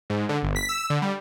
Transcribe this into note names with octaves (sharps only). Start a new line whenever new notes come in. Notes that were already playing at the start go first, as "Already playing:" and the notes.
G#2
D3
G1
B6
E6
D3
G3